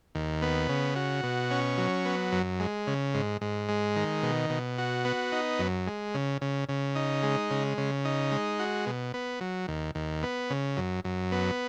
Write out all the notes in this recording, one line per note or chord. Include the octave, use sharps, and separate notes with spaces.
D#2
B3
C#3
F#4
B2
C#4
F#3
B3
F#2
G#3
C#3
G#2
G#2
G#3
D#3
B2
B2
F#4
B3
D#4
F#2
G#3
C#3
C#3
C#3
D#4
G#3
C#3
C#3
D#4
G#3
F#4
B2
B3
F#3
D#2
D#2
B3
C#3
F#2
F#2
B3